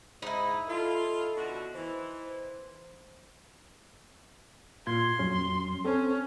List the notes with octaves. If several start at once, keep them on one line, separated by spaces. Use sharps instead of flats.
G#2 D#4 E4
F4 A4
B2 D3 F#4
E3 C5
A#2 F4 C6 G#6
F2 F#3 C#4
C4 C#4 A4